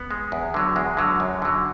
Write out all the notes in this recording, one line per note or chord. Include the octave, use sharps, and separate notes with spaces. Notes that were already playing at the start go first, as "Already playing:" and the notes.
Already playing: B3
G#3
E2
D3 F#3
E2 G#3
D3 F#3
F#2
D3 F#3